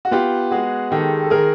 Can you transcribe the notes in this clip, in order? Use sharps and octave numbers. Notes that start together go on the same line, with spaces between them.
F#4
B3 F4 G4
G#3 F#4 G#4
D#3 G4 A4
A4
D#3 G#4 A#4